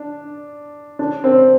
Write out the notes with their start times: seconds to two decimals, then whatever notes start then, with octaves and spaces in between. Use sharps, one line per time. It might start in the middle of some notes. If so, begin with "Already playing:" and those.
Already playing: D4
0.99 D4
1.24 C4